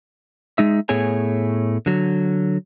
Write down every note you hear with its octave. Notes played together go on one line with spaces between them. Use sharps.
G#3 D#4 E5
A2 A3 B3 G#4 C#5 G#5
D3 F#3